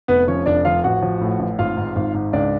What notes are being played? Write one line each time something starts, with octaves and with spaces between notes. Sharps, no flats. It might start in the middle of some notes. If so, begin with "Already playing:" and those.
F1 B3 B4
F3 C#4 C#5
F1 D4 D5
F3 F4 F5
A1 F#4 F#5
F3
A2
A1
G#1 F4 F5
G#2
G#1
G#2
C#2 D4 D5